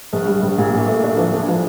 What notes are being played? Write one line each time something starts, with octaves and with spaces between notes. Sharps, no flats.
A#1
G3
A#1
A#2
A2
A3
D4
F3
D2
F3